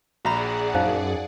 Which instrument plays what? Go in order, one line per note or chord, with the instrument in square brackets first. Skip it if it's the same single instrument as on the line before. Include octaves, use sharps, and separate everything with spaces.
[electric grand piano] A#1 A#5 [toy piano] F#4 E5 B5 [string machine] G#4 D5 F#5
[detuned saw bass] F#2 [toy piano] D#4 C5 F5